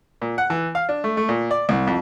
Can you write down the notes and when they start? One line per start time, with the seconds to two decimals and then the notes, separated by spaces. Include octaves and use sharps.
0.22 A#2
0.38 F#5
0.50 E3
0.75 F5
0.89 D4
1.04 A3
1.17 A3
1.29 A#2
1.51 D5
1.69 C2
1.87 F2